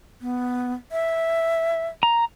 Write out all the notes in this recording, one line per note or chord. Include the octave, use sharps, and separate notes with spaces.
B3
E5
A#5